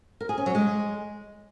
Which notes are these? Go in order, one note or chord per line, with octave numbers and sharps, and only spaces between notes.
A#4
G#4
C#4
F#3
G#3